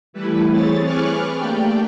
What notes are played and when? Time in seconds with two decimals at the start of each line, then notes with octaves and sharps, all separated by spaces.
0.13 E3 G3 A3 E4 B4
0.50 C4 G#4 C#5 A6
0.85 G#4 B4 C#6 D6 F6 F#6
1.35 A3 A#3 D4 G4 D5 G5